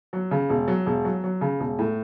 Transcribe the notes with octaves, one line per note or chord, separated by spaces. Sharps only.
F#3
C#3
E1
F#3
E1
F#3
F#3
C#3
E1
A2